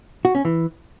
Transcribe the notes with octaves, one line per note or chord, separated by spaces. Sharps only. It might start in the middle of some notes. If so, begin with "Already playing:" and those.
F#4
C#4
E3